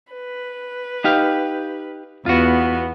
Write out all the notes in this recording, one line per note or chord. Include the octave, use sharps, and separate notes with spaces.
B4
D#4 G4 F5
E2 B3 F4 F#4